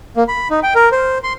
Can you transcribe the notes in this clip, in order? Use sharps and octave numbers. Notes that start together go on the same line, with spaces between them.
A#3
B5
D#4
G5
A#4
C5
C6